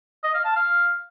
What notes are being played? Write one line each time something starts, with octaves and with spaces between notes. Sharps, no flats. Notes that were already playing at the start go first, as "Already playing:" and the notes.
D#5
F5
A5
F5